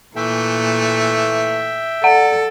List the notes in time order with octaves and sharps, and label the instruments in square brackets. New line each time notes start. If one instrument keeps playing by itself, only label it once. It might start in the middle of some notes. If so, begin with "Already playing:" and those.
[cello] A#2 [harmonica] E3 A3 [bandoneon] E5 G5
[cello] A4 [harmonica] D5 [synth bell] F#5